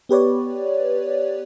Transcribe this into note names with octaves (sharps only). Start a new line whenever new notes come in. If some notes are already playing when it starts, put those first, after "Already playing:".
B3 G4 B4 C#5 D5